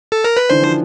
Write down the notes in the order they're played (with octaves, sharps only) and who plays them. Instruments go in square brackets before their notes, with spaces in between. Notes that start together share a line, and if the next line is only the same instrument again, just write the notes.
[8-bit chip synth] A4
A#4
B4
[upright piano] D3 E3 [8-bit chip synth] C5
[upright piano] D#3 F3